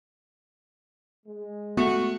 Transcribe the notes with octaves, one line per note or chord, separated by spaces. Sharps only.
G#3
A3 B3 F#4